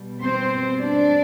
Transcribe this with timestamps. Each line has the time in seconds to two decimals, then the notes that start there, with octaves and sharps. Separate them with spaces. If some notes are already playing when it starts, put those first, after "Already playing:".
Already playing: B2 G3
0.22 C4 C5
0.80 D4 D5